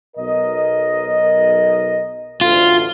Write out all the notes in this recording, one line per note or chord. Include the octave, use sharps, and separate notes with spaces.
B1 A#4 D#5
A1 D2 F4